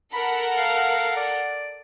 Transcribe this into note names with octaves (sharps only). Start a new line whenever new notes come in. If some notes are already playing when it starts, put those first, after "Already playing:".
A4 A#4 F#5 B5
F5
D5